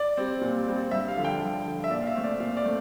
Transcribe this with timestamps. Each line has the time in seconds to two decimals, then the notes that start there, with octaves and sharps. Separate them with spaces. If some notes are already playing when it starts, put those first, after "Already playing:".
Already playing: D5
0.17 G3 C4
0.41 A#2
0.67 G3 C4
0.91 G2 E5
1.08 F5
1.17 D3 F3
1.24 G5
1.42 G2
1.66 D3 F3
1.84 E5
1.91 A#2 D5
2.02 F5
2.07 E5
2.15 A3 C4
2.24 D5
2.40 A#2 F5
2.57 D5
2.64 A3 C4